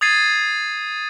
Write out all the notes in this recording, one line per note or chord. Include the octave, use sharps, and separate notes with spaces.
D#6 G#6 A6 C7 D#7